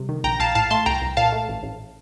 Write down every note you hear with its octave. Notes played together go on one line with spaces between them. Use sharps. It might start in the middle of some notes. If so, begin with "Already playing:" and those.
Already playing: C3 G3
D#3
A#1 G5 A#5
A#1 F5 A5
A2 F5 A5
A3 A5 C6
C2 G5 A#5
C2
A#2 F5 A5
A3
A1
A1